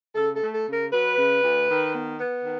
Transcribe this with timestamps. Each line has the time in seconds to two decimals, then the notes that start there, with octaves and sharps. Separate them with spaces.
0.15 C#3 A4
0.36 A4
0.41 A3
0.54 A4
0.67 C#3
0.73 A#4
0.91 F#3 B4
1.17 C#3
1.42 D2
1.68 D#3
1.94 B3
2.19 B3
2.44 D#3